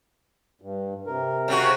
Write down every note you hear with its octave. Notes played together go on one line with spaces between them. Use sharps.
G2
C3 A#4
C#3 C4 F#4